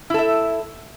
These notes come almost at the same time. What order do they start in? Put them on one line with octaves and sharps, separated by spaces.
E4 A4 E5